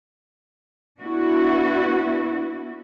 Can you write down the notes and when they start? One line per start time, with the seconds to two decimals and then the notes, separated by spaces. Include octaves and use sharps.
1.00 B3 D4 E4 F#4